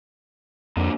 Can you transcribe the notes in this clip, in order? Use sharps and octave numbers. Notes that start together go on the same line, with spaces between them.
F2 A#2 D3